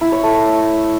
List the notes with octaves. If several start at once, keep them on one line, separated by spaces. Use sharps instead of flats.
E4
C#5
A3